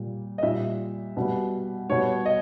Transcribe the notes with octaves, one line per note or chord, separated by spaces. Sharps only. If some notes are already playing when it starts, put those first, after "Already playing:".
Already playing: A#2 G3
D#5
A#2 G3 E5
B2 G3
B2 G3 C#5
D#5